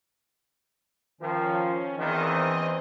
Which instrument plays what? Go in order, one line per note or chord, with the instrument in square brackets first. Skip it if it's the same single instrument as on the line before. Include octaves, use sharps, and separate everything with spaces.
[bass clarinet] D#3 [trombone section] F3 [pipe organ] C#4
[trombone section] A#1 E2 D#3 [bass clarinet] E3 [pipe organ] C4 D#5